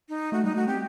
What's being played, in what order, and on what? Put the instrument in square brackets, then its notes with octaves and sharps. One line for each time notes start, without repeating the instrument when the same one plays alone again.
[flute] D#4
[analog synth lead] A3 [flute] F#4
[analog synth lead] G3 [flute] D#4
[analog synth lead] A3 [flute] F#4
[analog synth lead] C4 [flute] G4